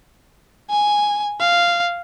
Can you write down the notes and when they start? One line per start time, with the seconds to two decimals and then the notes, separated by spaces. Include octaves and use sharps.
0.70 G#5
1.40 F5